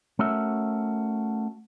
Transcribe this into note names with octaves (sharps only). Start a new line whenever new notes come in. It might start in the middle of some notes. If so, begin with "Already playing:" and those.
A3 C#4 F#4 A#4 E5